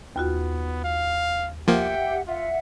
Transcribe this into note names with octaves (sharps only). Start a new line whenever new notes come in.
D#2 B3 F4 F#4
F5
F3 A#3 G4 E5 F#5 G5
F4 E5 F#5